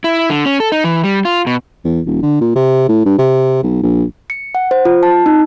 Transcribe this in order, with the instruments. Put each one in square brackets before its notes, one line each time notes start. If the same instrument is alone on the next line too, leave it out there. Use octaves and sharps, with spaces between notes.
[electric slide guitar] E4
D3
C#4
A4
D#4
E3
G3
F4
B2
[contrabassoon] E2
D#1
D3
A#2
C3
A2
G2
C3
B1
A#1
[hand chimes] C#7
F#5
C5
F4
A5
D#4